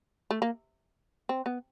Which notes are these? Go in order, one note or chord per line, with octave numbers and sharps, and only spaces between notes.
A3
A#3
C4
B3